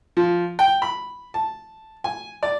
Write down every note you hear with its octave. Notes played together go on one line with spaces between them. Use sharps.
F3
G5
B5
A5
G#5
D5